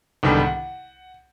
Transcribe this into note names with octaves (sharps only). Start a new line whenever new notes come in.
C2 G#2 D3 D#3 G3 B3
F#5